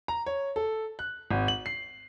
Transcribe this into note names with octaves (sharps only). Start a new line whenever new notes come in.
A#5
C#5
A4
F#6
G#1
F#7
C7